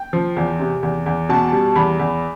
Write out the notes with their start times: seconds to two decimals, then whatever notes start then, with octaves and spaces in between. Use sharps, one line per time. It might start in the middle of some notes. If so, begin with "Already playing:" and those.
Already playing: G5
0.13 F3
0.36 E2
0.60 C3
0.83 E2
1.06 E2
1.29 B2 A5
1.52 G3
1.75 E2 B5
1.99 E2